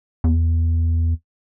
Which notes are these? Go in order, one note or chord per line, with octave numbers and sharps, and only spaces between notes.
E2